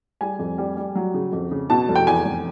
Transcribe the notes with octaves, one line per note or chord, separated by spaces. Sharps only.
G3 G#5
F2
G3
G3
F#3
C#3
F2
C#3
B2 A5
F1
G5
E2 G#5
F1